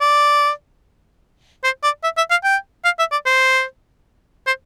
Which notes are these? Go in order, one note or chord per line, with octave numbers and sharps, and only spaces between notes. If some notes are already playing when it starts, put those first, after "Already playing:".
D5
C5
D5
E5
E5
F5
G5
F5
E5
D5
C5
C5